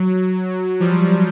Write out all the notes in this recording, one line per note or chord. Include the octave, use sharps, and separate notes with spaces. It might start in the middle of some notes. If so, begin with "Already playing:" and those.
Already playing: F#3
F3 G3